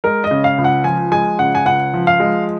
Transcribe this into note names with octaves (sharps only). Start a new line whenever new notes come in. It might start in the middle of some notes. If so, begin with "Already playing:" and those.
G#3 A#4
D#5
C#3
F5
C#2
F#5
F3 G#5
G#3 G#5
C#3 F#5
G#5
C#2 F#5
F3
F5
G#3